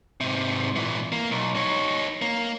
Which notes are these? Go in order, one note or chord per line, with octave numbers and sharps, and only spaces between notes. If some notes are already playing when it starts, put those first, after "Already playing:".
G#2 C3
A#2 E3
A#3
B1
D#4 C#5
A#3